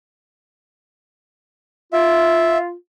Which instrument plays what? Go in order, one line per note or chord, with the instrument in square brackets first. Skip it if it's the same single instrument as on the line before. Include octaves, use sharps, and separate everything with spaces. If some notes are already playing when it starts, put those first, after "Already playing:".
[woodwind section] F4 [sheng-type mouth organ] E5